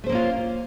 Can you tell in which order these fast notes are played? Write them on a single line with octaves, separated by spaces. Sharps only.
A3 C5 A#3 C#4 F4